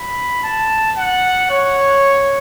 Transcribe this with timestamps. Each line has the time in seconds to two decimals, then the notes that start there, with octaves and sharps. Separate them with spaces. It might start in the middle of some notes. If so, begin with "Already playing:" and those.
Already playing: B5
0.44 A5
0.98 F#5
1.51 C#5